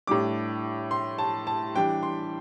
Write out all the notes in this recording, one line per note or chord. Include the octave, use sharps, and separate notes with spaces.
A2 G3 D4 D6
C6
A5
A5
E3 G3 D4 G5
C6